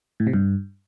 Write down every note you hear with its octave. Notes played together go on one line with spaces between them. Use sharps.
A2
C3
G2